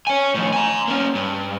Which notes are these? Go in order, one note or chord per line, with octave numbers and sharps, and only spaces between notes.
C#5 G#5
A2 F3
G#5 A#5
A#3 C#4
G2